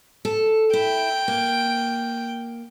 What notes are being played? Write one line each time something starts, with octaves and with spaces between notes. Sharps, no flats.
A4
E4 G5
A#3